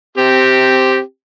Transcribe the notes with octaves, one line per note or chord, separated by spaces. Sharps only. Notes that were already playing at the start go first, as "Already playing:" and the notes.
C4 G4